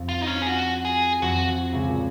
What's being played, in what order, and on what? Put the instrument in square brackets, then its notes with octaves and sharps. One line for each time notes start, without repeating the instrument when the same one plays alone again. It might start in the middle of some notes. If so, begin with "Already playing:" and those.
Already playing: [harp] F2 F3
[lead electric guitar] F4
D#4
C#4
G#4
F#4
G#4
[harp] F2 F3 [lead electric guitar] F#4
[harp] C#2 C#3
A#2